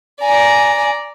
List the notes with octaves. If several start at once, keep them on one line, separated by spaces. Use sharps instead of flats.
D5 G#5 A#5